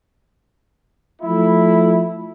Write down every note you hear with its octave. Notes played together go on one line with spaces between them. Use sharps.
F3 A3 E4